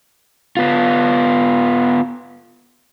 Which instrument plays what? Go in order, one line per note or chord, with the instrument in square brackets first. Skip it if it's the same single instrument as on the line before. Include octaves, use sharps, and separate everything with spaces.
[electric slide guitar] B3 F4